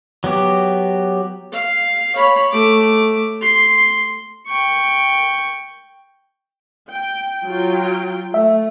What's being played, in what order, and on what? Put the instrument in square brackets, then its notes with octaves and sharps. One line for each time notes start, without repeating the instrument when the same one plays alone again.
[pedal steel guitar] F#3 B3 G4
[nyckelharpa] F5
C#5 B5
A3 D6
C6
G5 C#6
[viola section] G5
F#3 F4 G5
[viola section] A3 [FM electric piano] E5